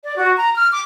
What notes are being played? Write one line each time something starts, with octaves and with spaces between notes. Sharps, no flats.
D5
F#4
A#5
F6
D6